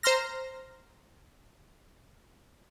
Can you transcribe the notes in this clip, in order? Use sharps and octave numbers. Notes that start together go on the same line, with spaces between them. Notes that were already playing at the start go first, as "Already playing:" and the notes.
C5 A#5 C6 F6 A#6